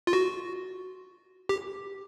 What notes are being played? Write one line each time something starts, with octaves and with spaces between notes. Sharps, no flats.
F4
F#4
G4